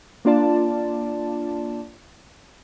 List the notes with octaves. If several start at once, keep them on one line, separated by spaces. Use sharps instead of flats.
A#3 D4 F4 D5 A5